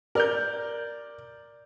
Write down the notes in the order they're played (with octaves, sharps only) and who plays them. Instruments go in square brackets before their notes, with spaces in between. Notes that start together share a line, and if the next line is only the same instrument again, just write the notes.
[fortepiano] A#4 [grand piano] D5 F6 G6